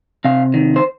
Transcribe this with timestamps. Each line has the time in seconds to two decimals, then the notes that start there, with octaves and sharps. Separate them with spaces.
0.25 C3 F5
0.54 D#3
0.76 C5